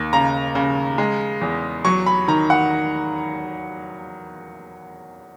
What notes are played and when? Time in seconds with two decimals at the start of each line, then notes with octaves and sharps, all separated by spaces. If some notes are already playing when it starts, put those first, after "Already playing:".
Already playing: D#2
0.13 C#3 A#5
0.55 C#3
0.98 G#3
1.41 E2
1.85 F#3 C#6
2.06 B5
2.28 D#3 A#5
2.50 F#5